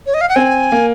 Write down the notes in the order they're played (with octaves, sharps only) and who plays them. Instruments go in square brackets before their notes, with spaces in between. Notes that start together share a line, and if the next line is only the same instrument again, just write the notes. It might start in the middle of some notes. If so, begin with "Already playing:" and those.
[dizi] C#5
D#5
F5
F#5
[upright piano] C4 [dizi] G#5
[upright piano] A#3